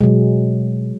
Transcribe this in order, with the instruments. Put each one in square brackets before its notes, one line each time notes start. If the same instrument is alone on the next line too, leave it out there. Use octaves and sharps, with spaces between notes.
[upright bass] B2 A3 [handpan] F#3 G#3